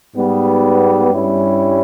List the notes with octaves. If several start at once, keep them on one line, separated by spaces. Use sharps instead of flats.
G#2 G3 B3
G2 G3 C#4 E4